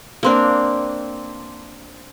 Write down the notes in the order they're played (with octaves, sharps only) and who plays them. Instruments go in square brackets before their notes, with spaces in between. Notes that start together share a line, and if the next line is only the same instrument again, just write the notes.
[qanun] A#3 C4 D4